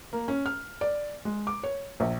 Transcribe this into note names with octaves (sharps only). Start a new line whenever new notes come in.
A#3
C#4
F6
D5
G#3
D6
C#5
A#1